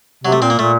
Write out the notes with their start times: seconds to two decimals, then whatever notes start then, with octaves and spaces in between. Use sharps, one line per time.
0.24 C3 F#3
0.32 A3
0.42 A#2 C4
0.50 A#3
0.59 A#2 A3